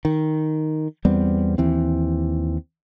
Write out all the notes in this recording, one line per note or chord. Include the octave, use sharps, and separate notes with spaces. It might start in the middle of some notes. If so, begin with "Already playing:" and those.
D#3
E2 G3 B3 C4
D#2 E3 C4